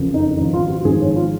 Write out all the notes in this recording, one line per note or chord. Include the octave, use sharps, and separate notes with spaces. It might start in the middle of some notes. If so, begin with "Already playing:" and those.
Already playing: F#1 F2 C#3 F3
D#4
G#1 G#2 F3 D#4
F4
F#4
G#1 G#2 F3 G#4
C#5
F4